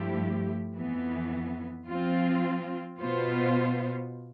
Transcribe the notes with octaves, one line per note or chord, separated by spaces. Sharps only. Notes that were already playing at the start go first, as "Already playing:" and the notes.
Already playing: G2 F3 A3 E4 G4
F2 E3 B3
F3 C4 F4
B2 B3 F4 C5